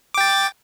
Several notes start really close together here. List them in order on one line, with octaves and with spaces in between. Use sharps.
D6 G5 A6